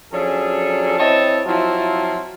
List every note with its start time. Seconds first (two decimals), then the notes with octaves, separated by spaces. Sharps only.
0.11 F3 F#3 C#4 D4 G#4 A4
0.98 C4 E4 C#5 D#5 A5
1.46 F3 F#3 C4 E4 F4